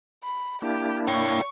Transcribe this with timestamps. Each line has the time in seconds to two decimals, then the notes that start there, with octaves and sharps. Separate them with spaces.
0.24 B5
0.62 A#3 D4 E4 G4
1.08 C#5 G5 C#6